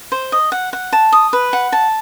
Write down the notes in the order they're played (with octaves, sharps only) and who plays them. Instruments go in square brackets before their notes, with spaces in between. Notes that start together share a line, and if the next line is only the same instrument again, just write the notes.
[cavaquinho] C5
D#5
F#5
F#5
A5
D#6
B4
F#5
A5